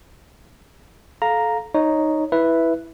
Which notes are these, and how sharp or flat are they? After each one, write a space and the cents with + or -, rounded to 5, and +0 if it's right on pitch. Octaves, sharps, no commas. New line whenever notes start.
A4 -25 F5 +10 A#5 +0
D#4 +0 C#5 +0
E4 -5 B4 +0 E5 +0